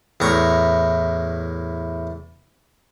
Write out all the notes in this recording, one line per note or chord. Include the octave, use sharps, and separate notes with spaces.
E2 A2 A#5 C#6